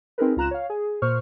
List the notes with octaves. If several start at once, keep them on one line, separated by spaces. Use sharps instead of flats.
C4 D#4 G#4 A#4 B4
C#2 F4 A#5 F#6 E7
C#5 F5
G#4
A#2 C5 C#6 F6